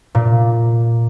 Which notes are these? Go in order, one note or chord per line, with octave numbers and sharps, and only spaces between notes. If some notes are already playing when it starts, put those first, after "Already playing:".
A#2